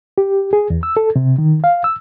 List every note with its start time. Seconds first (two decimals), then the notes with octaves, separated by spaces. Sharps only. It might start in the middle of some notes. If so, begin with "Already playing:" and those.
0.18 G4
0.53 G#4
0.70 E2
0.83 E6
0.97 A4
1.16 C3
1.38 D#3
1.64 F5
1.84 E6